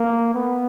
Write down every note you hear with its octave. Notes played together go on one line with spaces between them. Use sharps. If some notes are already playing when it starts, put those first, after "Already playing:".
Already playing: A#3
B3